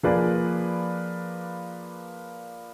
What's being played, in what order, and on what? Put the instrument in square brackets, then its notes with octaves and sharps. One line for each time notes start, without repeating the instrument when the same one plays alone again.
[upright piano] F3 A#3 G#4 B4 D5